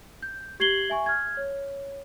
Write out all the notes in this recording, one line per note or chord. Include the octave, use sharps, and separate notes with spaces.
G6
G4 G#6 C7 F#7 G7
E5 G#5 C#6
F6 G#6
C#5